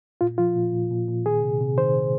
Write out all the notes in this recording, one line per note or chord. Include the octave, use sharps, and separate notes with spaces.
A#2 F4
F3 F4
A#2
A#2
A#2
A#2
D#3 G#4
C3
C3
D#3 C5
D#3